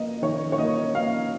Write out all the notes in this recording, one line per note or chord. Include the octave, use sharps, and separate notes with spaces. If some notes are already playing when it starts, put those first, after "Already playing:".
Already playing: A#3 D#5
D#3 C#5
C#5
A#3 D#5
A#3 F5